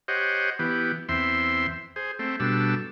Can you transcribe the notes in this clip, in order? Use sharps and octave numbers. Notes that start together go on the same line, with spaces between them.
G4 C5 C#5 D#5 F#5
E3 B3 G4
E2 C4 E5 C6
G#4 C5
A3 C4
B2 G3 D4 A4 E6